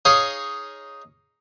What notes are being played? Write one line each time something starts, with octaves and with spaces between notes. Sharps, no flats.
D#4 G#4 C#5 D#5 F5